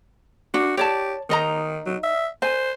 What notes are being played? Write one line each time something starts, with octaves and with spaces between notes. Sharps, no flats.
D4 F#4
G4 C#5 D5 A5
D#3 D#4 D#5 A#5
F#3
E5
C5 G#5